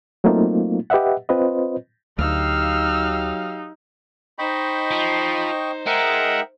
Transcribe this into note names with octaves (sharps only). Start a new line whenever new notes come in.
F#3 A3 A#3 C4 D#4 F4
G4 B4 D#5 E5 F#5
C4 F4 B4 C5 D#5
D2 F#3 D#4 G4 F5 E6 F6
D#4 C5 D#5 G5 B5 C#6
F3
G#3 D#4 A#4 E5 F#5 G5